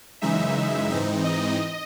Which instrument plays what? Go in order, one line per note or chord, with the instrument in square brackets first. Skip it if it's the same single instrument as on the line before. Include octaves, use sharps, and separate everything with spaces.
[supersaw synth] F#2 C#3 E3 G#3 D#4 E5
G#2 E3 C4 D#4
D#5